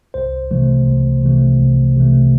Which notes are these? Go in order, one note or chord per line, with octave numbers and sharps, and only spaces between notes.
C2 C5
C3 E3 A3
C2
C3 E3 A3
C2
C3 E3 A3